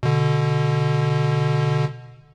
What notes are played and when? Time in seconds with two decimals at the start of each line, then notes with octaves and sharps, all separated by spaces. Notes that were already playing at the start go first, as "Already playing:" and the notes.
0.03 B2 D3